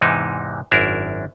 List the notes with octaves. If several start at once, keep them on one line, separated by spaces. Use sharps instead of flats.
E2 G#2 C3 E3 D#4
G#1 F#2 D4 E4 A#4